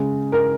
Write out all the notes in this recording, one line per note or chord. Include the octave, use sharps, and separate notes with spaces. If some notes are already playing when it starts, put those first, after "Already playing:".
Already playing: C#3 G#3
A#4